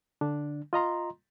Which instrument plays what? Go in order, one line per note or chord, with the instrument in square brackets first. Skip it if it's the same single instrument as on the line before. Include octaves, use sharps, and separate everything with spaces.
[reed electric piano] D3 D4
F4 D#5 A#5 C6